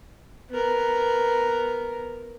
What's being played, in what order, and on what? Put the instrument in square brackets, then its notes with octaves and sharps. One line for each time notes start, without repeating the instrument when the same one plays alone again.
[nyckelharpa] B3 A#4